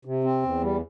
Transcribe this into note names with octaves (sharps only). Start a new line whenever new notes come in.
C3
C4
E2
G3